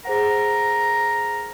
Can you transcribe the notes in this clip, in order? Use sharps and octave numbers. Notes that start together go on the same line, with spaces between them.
G#4 A#4 C5 F#5